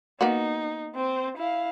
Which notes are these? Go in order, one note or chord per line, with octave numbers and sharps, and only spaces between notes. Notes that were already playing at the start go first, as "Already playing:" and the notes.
A#3 B3 D#4 F#4
C4 C5
E4 F5